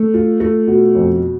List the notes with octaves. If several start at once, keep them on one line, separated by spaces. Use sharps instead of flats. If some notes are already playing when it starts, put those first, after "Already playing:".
Already playing: A3
F4
A3
B2
F2